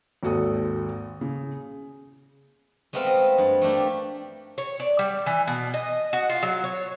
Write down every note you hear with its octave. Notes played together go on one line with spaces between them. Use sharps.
G#1 D#2 F#4 A4 D#6
C#3
G#3 A3 B3 C4 F5
D#5
G2
A3 A#3 D4 G4
C#5
D5
G3
E3
B2
D#5
F#4
F4
F#3
C#5